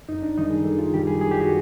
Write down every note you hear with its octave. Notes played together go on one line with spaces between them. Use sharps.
F#2 D#4
D4
D#3 G3 D#4
G#4
F#2 A4
F4
D#3 G3 G4
G#4
F#2 G#4
G4
F#4